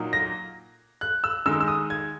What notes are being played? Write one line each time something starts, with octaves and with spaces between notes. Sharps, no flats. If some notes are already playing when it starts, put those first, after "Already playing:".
Already playing: A#2 F#3 A#3 D#4
A#6
F#6
E6
D#3 G#3 D#4 E6
E6
D#6
G#6